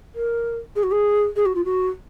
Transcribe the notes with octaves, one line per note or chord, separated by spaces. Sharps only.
A#4
G#4
F#4
G#4
G#4
F#4
F4
F#4